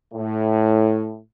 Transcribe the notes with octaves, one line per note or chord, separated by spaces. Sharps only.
A2